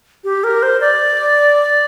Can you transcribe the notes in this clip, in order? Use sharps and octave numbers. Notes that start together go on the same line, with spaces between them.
G4
A#4
C5
D5